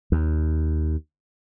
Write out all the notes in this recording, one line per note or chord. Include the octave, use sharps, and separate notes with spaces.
D#2